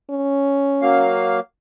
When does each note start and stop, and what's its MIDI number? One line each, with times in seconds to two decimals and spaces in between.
0.10 1.09 61
0.82 1.40 54
0.82 1.40 58
0.82 1.40 77